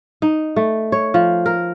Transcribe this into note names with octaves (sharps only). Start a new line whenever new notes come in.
D#4
A3
C#5
F3
A#4